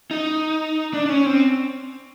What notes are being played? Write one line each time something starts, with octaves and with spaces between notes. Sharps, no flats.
D#4
D4
D4
C#4
C4